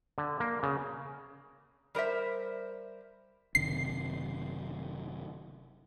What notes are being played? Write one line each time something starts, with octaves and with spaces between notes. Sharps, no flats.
D3
A#3
C#3
G3 A#4 C5 E5
F#1 C3 D#3 C7